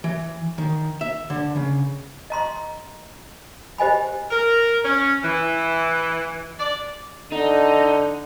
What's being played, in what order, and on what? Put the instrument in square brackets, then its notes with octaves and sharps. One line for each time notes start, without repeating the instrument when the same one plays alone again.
[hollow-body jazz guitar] E3
D#3
E5
D3
C#3
[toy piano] D#5 A#5 C6
G4 C5 D#5 G#5 B5
[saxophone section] A#4
C#4
E3
D5
[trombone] D3 [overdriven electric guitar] D#4